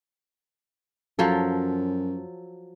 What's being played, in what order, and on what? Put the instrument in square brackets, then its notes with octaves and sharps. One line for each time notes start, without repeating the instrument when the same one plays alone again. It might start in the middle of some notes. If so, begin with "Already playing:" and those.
[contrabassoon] F#2 [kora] F3 F#3 A4